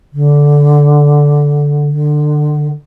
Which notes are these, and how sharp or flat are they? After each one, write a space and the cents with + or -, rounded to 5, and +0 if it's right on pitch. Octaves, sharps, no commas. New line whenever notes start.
D3 -10
D3 +25